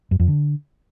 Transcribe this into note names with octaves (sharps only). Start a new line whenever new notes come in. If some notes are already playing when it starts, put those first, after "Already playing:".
F#2
F2
D3